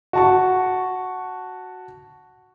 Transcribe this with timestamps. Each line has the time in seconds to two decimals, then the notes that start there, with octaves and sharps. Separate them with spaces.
0.13 F#4 A5 C#6